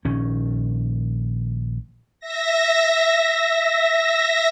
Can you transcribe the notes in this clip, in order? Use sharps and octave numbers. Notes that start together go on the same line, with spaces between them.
A#1 D#3 C#4
E5 A#6